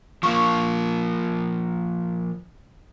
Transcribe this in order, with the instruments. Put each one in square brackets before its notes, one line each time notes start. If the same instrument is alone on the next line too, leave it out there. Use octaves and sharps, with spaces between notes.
[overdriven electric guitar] F3 A#3 [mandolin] F5 C#6